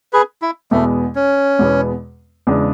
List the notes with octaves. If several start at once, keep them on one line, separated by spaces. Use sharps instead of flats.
G#4 B4
E4
E2 B2 G#3 A3 B3
C#4
E2 B2 G#3 B3
E2 C#3 G#3 D4